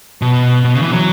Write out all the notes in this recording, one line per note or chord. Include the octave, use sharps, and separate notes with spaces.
B2
B2
C#3
E3
F#3